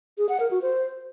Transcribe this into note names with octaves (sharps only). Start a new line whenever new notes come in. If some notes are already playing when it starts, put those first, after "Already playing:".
G#4
F#5
A#4
F#4
C5